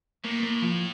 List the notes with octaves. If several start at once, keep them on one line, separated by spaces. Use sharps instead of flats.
A2 A#3
A#3
F3